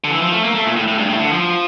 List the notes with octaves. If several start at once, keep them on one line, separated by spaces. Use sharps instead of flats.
D3
E3
F3
A3
A#3
A3
A#2
A2
A2
G2
A2
D3
F3